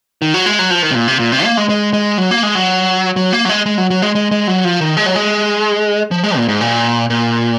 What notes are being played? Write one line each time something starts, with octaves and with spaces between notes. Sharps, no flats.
D#3
F#3
G#3
F#3
F3
D#3
C3
A#2
C3
A#2
C3
A#3
G#3
G#3
G#3
F#3
A#3
G#3
F#3
F#3
A#3
F#3
G#3
G#3
F#3
F#3
G#3
G#3
G#3
F#3
F3
D#3
G#3
F#3
G#3
F3
G#3
A#2
G#2
A#2
A#2